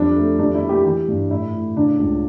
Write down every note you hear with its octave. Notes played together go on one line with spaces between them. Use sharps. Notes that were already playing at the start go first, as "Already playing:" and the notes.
Already playing: F2 G3 D4
A3
G3 D4
E4
A#3
G4
E3 G4
G2
A2 E4
A2
C#3 D4
C#2